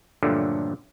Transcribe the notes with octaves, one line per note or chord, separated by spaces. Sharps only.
G2 A#2 D3 F3 F#3 A3